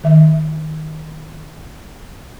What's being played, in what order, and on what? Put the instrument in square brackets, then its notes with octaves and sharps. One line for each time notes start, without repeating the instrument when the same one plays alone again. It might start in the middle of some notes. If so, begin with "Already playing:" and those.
[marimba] D#3 E5